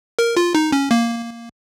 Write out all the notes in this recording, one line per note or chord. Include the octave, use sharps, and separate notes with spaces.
A#4
F4
D#4
C#4
A#3